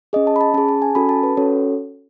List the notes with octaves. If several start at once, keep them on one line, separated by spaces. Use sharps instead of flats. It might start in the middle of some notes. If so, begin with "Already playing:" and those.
C#4 G#4 D#5
A5
B5
A5
C#4 G#4 A5
A5
G#5
C#4 F#4 A4 B5
A5
B4
C#4 F#4 A4 C#5